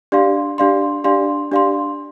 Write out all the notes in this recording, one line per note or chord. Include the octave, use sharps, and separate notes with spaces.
D4 G4 D5 F5 C6
D4 G4 D5 F5 C6
D4 G4 D5 F5 C6
D4 G4 D5 F5 C6